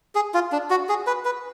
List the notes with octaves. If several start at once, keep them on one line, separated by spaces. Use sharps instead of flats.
G#4
F4
D4
F#4
G#4
B4
B4